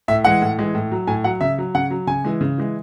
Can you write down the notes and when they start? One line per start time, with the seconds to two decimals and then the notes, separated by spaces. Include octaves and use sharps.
0.08 A2 E5
0.24 E3 G#3 F#5
0.42 A2
0.59 E3 G#3
0.75 A2
0.91 F#3
1.07 A2 G#5
1.24 F#3 F#5
1.41 C#3 E5
1.58 F#3
1.75 C#3 F#5
1.90 F#3
2.07 C#3 G#5
2.24 E3 G#3
2.41 C#3
2.58 E3 G#3